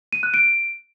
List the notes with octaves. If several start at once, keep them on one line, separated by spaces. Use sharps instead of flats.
D#7
F#6
D7